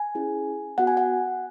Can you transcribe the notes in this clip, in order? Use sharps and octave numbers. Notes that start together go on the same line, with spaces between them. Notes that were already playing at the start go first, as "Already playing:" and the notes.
Already playing: G#5
C#4 E4 G#4
B3 F#4 F#5
G#5
F#5